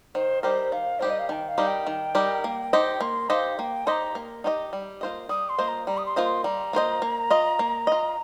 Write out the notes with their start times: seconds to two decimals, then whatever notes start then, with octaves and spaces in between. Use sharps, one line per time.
0.15 D#3 C5
0.43 G3 D#4 G4 A#4 C5
0.72 D#3 F5
1.00 G3 D#4 G4 A#4 C5
1.10 D#5
1.19 F5
1.29 D#3 A#5
1.32 G5
1.48 F5
1.58 G3 D#4 G4 A#4
1.67 G5
1.87 D#3
2.15 G3 D#4 G4 A#4
2.44 A#3
2.73 D#4 G4 C5 D#5
3.00 A#3 C6
3.30 D#4 G4 C5 D#5 F5
3.58 A#3 G5
3.87 D#4 G4 C5 D#5 A#5 C6
4.15 A#3
4.44 D#4 G4 C5 D#5
4.73 G3
5.01 A#3 F4 C5 D#5
5.29 G3 D#6
5.49 C6
5.58 A#3 F4 C5 D#5
5.68 A#5
5.87 G3 A#5
5.98 D#6
6.06 C6
6.16 A#3 F4 C5 D#5
6.25 C6
6.44 G3 A#5
6.73 A#3 F4 C5 D#5
7.02 A#3
7.30 F4 D#5
7.59 A#3
7.87 F4 D#5